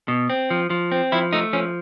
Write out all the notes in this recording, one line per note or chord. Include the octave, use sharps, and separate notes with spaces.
B2
C4
F3
F3
C4
F3 E4
A3 D#4
F3 C#4